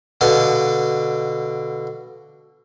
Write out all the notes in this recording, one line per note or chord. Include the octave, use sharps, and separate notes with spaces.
B2 D3 F5